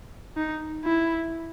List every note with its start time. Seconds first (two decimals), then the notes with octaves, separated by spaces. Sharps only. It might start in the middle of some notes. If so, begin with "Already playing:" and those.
0.37 D#4
0.84 E4